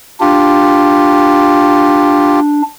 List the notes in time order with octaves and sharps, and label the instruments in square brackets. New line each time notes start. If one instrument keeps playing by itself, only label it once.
[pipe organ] D4 [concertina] F4 G4